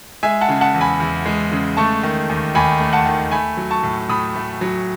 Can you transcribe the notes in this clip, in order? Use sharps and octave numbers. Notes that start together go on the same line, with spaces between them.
G#3 E5 G#5
F#5 A5
C#3
F#5 A5
E2
G#5 B5
E2
G#3
C#3
A3 A5 C#6
D#3
D#2
D#2 G#5 B5
A3
F#5 A5
D#3
A3 G#5 B5
F#3
A5 C#6
A2
A2 B5 D#6
A3
F#3